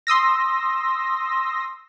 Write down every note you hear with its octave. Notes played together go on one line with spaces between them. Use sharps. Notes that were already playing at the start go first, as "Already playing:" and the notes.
C6 D#6 E6 A#6